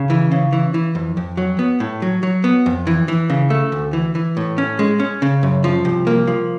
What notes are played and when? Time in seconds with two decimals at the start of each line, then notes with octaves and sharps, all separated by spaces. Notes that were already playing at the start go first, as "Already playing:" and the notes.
Already playing: C#3
0.10 E3
0.32 C#3
0.53 E3
0.74 E3
0.95 F2
1.17 F2
1.37 F#3
1.59 B3
1.80 A2
2.02 F#3
2.23 F#3
2.44 B3
2.66 F2
2.87 E3
3.08 E3
3.30 C#3
3.50 A3
3.72 D2
3.93 E3
4.15 E3
4.37 A2
4.58 C#4
4.79 G#3
4.99 C#4
5.22 C#3
5.43 F#2
5.64 F3
5.85 C2
6.07 A#3
6.27 F3